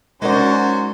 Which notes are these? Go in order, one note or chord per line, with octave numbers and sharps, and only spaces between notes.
F#3 G#3 C#4 D#4 F#4 A#4 C5 D5